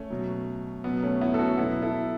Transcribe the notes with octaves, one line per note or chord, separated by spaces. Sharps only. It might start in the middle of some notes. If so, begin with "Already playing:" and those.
Already playing: A3 C#4
B2 F#3
B2 F#3 B3
A3 C#4
B3 E4
A4
C#4 F#4
B2 F#3 B3 E4
E4 A4